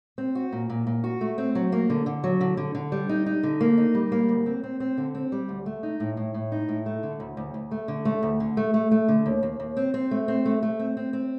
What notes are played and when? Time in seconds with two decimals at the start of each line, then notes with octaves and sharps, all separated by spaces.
0.18 C4
0.35 F#4
0.52 A#2
0.70 A#2
0.87 A#2
1.04 F#4
1.21 A3
1.38 C4
1.55 F#3
1.72 A#3
1.90 D3
2.06 D3
2.24 F#3
2.41 D3
2.57 D3
2.75 D3
2.92 G3
3.09 D#4
3.26 D#4
3.43 D3
3.61 A#3
3.78 D#4
3.95 G3
4.12 A#3
4.29 D2
4.46 C4
4.63 C4
4.80 C4
4.98 D3
5.15 C4
5.32 G3
5.49 D2
5.66 A3
5.83 D#4
6.00 A2
6.17 A2
6.34 A2
6.52 D#4
6.69 A2
6.86 A3
7.03 D3
7.20 D2
7.37 D2
7.54 D2
7.71 A3
7.88 D3
8.05 A3
8.23 D2
8.40 D3
8.57 A3
8.74 A3
8.91 A3
9.08 D3
9.26 D#2
9.43 D#2
9.60 D#2
9.77 C4
9.94 C4
10.11 A3
10.28 C4
10.45 A3
10.62 A3
10.79 C4
10.97 C4
11.13 C4